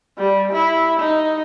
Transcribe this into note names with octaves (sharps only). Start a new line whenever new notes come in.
G3
E4
D#4